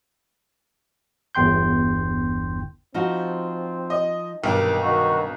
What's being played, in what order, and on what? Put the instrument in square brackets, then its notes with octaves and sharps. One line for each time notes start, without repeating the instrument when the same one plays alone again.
[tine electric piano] G1 E2 G5 C6 G6
[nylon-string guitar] F3 D#4 F#4 [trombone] C4
[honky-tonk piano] D#5
[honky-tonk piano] B1 A#4 [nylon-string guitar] G2 C3 [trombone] D#3 [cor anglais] G4
[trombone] D#3 [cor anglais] F#4